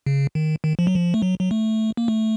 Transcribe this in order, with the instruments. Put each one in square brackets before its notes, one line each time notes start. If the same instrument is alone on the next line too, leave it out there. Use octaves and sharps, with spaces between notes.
[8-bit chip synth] C#3
D#3
D#3
F3
F#3
F3
A3
F#3
F#3
A3
A#3
A3